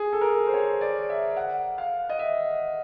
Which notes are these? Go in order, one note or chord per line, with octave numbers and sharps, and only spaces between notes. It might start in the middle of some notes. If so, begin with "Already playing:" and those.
Already playing: G#4
A4
A#4
A4
C5
C#5
D5
E5
F#5
F5
D#5
E5